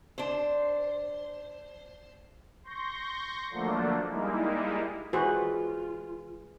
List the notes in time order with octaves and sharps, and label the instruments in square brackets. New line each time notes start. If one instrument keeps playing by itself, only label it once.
[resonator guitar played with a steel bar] D4 C5
[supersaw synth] C6 C#6 G6 A#6
D3 F3 F#3 A3 A#3 D4
G3 G#3 A#3 D#4 E4
[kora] E3 [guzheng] G#3 G#4 D5 [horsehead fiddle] F4 [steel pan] F#4 B4 C5